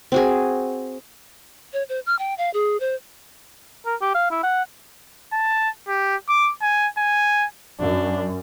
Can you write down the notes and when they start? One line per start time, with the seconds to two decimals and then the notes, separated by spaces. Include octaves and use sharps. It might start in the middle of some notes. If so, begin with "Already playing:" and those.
0.12 C4 F#4 G#4
1.73 C#5
1.89 C5
2.06 F6
2.19 G5
2.38 F5
2.54 G#4
2.80 C5
3.86 A#4
4.01 G4
4.14 F5
4.31 E4
4.43 F#5
5.33 A5
5.88 G4
6.28 D6
6.62 G#5
6.98 G#5
7.80 F#2 D4